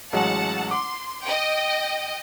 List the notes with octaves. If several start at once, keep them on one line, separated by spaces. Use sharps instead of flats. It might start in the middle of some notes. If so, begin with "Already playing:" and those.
A1 F#3 G#3 F#5 A5
C6 D6
D#5 G5